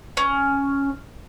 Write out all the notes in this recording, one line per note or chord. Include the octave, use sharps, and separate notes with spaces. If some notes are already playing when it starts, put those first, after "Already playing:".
C#4